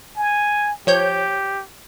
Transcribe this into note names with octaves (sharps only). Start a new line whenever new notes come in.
G#5
F3 G4 C#5 G6